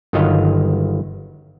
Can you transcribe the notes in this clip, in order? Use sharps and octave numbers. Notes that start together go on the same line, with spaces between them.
G1 D#3 F#3 D#5 F5